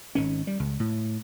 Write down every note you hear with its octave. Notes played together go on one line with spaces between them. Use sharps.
G#1 D#3 C#4
G3
C#2
A2